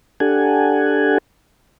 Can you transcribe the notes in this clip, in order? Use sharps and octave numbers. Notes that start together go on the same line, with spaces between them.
D4 G4 A4 F#5 G#5